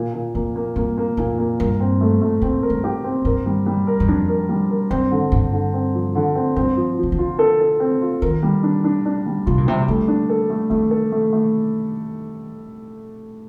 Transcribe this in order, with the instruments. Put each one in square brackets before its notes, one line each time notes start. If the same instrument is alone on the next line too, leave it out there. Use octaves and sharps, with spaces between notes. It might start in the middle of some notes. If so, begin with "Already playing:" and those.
Already playing: [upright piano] A#2
A#2
[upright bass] F2 [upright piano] A#3
[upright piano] A#3
[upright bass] G2 [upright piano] A#3
[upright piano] A#3
[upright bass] F2 [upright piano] A#2
[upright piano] A#3
[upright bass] G2 [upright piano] A#4
[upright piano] C4
A3
A3
[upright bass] A2 [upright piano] C4
[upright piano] A#4
[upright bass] G2
[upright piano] G4
C4
[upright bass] G2 [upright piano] A#4
[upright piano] G3
G3
A#4
[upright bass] G2
[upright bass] F2 [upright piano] D4
[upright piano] A#4
G3
A#4
[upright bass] G2 [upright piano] C4
[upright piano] D3
[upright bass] G2 [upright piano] D3
[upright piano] D3
C4
F3
D3
C4
[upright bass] G2 [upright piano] C4
[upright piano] F3
F3
[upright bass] C3
D3
[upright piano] F4
A4
A4
C4
F4
[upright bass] D#3 [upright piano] A#4
[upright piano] G3
D4
D4
D4
G3
[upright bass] C3 [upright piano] F4
[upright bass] A#2
[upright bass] C3 [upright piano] G3
[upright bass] D3 [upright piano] A3
[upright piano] D4
A4
A3
[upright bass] D#3 [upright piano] A3
[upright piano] A4
A3
A3